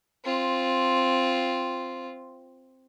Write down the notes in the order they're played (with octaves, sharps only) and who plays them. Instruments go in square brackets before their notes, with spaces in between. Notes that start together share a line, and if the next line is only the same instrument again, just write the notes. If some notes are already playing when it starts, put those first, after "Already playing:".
[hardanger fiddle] C4 F4